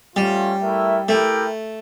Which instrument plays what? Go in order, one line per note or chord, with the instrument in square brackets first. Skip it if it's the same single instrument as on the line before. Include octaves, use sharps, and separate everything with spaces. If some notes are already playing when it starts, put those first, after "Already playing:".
[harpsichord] G3 [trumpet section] A3 C#4 F4
[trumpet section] A3 E4 A#4 E5
[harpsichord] A3 [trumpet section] E4 G4 A#4 E5 G5